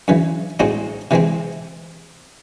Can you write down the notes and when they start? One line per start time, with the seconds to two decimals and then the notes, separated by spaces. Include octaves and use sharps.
0.08 F#2 C#3 E3
0.60 A2 G#3 C4 D#4 F#4
1.11 C3 E3 G#3 C4